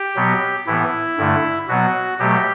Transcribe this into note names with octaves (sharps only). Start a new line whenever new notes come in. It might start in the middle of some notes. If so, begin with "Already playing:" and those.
Already playing: G4
B2 F#3 B3
A2 E3 B3 E4
G2 D3 A3
B2 F#3 B3 F#4
B2 F#3 A3 G4